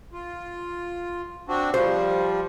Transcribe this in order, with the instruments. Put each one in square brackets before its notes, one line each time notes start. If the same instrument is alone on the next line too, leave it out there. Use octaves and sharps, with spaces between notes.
[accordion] F4
C4 D4 F#4
[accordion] F3 G3 [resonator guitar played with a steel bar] C5